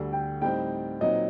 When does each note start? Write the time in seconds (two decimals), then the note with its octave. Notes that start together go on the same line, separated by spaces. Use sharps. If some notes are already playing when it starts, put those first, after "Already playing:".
Already playing: D2 D3 G3
0.13 G5
0.41 A2 G3 C4 D#4 G5
1.01 A#2 F#3 C4 D#4 D#5